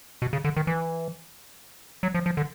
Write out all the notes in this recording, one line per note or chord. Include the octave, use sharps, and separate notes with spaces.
B2
C#3
D3
D#3
E3
F#3
F3
F3
D3